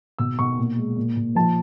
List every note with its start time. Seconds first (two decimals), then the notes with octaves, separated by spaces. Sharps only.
0.18 B2 E6
0.39 B2 C#6
0.58 A#2
0.77 G#3
0.96 A#2
1.16 A#2
1.35 F3 A5